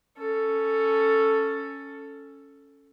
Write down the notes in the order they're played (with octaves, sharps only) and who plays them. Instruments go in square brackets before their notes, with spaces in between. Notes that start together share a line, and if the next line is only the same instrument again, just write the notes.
[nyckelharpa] C#4 A4